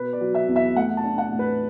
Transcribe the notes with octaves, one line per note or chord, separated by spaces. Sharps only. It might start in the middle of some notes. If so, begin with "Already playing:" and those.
Already playing: B2 B4
D5
F#3
E5
E2
E5
A3 F#5
A5
D4
F#5
A2
B4